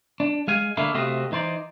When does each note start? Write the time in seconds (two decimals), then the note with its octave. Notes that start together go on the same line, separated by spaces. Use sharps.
0.20 D4
0.48 G#3 F5 G#5
0.77 D3 A3 A#3 E4 F5
0.94 C3 A3 C4 F#4 D#5 F5
1.32 E3 D#4 C5 D5